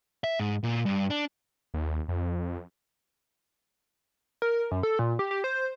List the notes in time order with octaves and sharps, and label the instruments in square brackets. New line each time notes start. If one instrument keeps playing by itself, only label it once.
[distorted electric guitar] E5
G#2
A#2
G2
D4
[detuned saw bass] D#2
F2
[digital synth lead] A#4
F#2
A4
A#2
G4
G4
C5